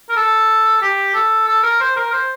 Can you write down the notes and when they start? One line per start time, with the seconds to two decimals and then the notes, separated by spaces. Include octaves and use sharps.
0.09 A#4
0.16 A4
0.82 G4
1.14 A4
1.47 A4
1.63 A#4
1.80 C5
1.97 A#4
2.13 C5